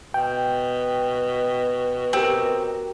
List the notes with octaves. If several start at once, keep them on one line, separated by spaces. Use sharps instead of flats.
B2 G5
C4 F#4 G4 A#4